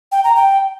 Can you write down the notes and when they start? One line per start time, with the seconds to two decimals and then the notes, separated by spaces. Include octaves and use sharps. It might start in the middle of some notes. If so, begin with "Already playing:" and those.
0.12 G5
0.24 A#5
0.36 G5